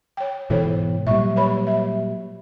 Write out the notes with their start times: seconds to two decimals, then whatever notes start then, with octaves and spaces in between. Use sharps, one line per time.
0.17 C#5 G5
0.50 G#2 B2 E3 A4 C5 C#5
1.07 A#2 F#3 G3 E5 C#6
1.36 B4 C#5 B5
1.67 E5